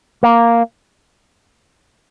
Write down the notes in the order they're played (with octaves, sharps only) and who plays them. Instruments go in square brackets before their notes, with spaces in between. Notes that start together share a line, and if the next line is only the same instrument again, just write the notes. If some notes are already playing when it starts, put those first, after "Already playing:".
[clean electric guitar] A#3